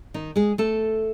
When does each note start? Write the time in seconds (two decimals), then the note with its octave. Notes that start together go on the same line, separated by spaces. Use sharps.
0.14 D#3 D#4
0.36 G#3 G#4
0.58 A3 A4